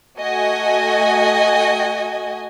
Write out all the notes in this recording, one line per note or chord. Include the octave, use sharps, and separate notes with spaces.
A3 F#4 D#5 G#5